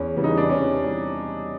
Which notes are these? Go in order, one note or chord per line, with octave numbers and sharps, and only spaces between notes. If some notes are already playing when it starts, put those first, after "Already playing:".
Already playing: E2 C#4
C#3 E3 G3 B3
D#4
D4
C3 C#4
E3 G3